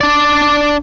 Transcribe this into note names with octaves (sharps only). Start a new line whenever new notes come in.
D4 D5